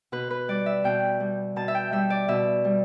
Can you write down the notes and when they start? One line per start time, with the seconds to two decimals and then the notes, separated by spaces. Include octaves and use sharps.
0.12 B2 B4
0.30 B4
0.48 G3 D5
0.66 E5
0.84 B2 G5
1.20 G3
1.56 B2 A5
1.68 E5
1.75 G5
1.92 G3 E5
2.10 D5
2.28 B2 E5
2.65 G3